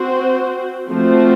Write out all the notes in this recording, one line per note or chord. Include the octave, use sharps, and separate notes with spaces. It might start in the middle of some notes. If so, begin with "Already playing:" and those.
Already playing: C4 F#4 C5
F3 A3 C4 F#4 C5